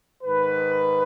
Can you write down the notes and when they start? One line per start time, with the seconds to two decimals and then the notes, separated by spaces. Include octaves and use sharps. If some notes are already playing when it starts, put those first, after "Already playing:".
0.23 G#2 D#3 B4